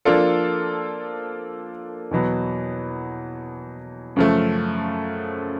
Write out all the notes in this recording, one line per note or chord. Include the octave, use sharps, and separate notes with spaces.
F3 A#3 D4 F4 A4
E2 B2 F#3 B3
F#2 C#3 F3 A3